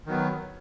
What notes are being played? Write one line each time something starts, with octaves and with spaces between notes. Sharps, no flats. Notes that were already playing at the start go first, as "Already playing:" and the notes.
D#3 F#3 B3